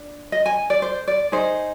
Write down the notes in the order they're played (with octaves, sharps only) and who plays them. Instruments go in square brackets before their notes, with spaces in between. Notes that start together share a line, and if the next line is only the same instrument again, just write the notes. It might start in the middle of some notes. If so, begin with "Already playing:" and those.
Already playing: [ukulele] D4
D#5
G#5
D5
C5
D5
D#4 G#4 C5